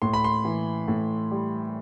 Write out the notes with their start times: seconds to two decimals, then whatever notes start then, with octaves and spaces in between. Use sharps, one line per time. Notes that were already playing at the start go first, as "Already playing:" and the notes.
0.02 A2 C6
0.13 B5
0.24 C6
0.45 E3
0.88 A2
1.31 G3